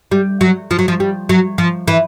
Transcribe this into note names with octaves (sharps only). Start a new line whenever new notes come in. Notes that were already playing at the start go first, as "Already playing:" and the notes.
G3
F#3
F3
F#3
F3
G3
F#3
F3
E3